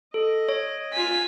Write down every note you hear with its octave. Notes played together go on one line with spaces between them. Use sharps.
A4 D#5
C#5
F4 G#5 B6